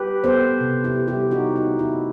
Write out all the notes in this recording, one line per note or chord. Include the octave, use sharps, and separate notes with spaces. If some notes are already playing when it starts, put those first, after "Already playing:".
Already playing: G4 B4
B3 A4 C5
C3
E4 G4
C3
E4 G4
C4 D#4 F#4
D#4
A3
E4